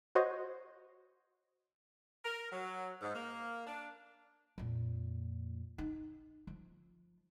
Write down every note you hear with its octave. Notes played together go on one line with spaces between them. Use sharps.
F#4 C5 C#5 D#5
A#4
F#3
G#2
A#3
D4
F2 A#2
D#4
F3